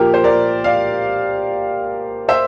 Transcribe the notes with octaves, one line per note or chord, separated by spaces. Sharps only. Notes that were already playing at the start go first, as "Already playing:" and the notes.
Already playing: A#2 F3 A#3 G4 A#4
C5
A#4 D5
D5 F5
C5 E5